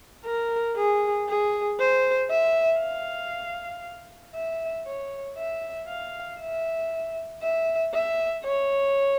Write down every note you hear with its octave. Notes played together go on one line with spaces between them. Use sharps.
A#4
G#4
G#4
C5
E5
F5
E5
C#5
E5
F5
E5
E5
E5
C#5